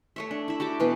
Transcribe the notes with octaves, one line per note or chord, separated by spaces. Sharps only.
A3 C#5 E5
D4
E4 E5
F#4 G4 A5 D6
B2 E3 B3 B4